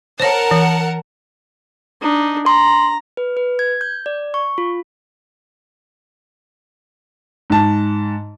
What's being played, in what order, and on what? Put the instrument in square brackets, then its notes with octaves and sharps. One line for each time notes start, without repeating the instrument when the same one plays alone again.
[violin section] A#4 F#5 A5 [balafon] C5 C#5
[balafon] E3
[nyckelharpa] D4 D#4
[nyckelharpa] A#5 [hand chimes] C6
[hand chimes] B4
B4
G#6
G6
D5
C#6
F4
[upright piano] G#2 A5